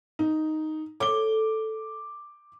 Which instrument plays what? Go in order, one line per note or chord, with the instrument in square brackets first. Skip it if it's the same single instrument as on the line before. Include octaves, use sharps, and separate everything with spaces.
[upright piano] D#4
[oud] A4 C#5 [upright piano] D6 G7